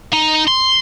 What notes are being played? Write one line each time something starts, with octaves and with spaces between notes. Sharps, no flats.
D#4
C6